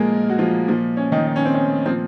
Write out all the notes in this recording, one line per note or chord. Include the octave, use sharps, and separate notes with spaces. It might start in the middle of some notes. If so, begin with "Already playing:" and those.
Already playing: A#2 F3 G#3 A#3 G#4 A#4
F#4
F3 F4
A#2 F3
C#4
D#3 D#4
D#4
C#4
C4
C#4
A#2 F3 C4